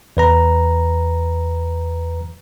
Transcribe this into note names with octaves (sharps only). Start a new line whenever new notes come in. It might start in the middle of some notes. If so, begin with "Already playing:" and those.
E2 B4 A#5